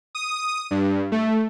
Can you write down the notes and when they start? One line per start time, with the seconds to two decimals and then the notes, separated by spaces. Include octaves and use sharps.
0.15 D#6
0.71 G2
1.12 A3